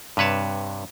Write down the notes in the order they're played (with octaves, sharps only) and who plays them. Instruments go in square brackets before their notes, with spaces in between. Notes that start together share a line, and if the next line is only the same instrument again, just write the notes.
[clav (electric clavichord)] G2 C3 B4 C#5 A5